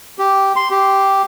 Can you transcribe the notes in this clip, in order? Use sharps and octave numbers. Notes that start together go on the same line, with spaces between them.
G4
C6
G4